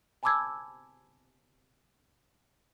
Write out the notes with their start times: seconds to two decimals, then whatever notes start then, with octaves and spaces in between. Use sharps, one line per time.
0.23 G#5 A5 B5 D6 E6 G#6